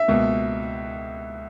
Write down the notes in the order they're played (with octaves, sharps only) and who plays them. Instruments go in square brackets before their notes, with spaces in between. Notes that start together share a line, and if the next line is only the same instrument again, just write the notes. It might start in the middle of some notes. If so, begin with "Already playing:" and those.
Already playing: [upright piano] E5
[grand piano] C#2 B2 A#3